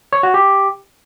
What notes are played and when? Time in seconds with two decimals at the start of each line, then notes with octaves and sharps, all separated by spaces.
0.13 C#5
0.23 F#4
0.34 G4